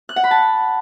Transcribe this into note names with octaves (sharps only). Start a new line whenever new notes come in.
F#6
F#5
B5
A5